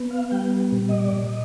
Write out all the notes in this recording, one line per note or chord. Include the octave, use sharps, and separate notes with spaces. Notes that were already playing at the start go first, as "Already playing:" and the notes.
Already playing: B3
F5
G3 G5
A#2
D#5
D5
A#2
D#5